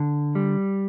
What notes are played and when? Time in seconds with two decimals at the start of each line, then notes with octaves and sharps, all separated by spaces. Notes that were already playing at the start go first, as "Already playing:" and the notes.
Already playing: D3
0.35 G3